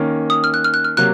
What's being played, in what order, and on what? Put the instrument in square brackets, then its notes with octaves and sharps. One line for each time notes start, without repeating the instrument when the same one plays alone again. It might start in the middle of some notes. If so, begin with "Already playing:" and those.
Already playing: [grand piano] D#3 A#3 C#4
[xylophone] D#6
F6
F#6
F6
F#6
F6
[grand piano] C3 F#3 A#3 [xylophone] F#6